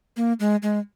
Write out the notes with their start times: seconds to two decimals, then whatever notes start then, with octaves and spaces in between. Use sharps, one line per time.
0.17 A#3
0.40 G#3
0.63 G#3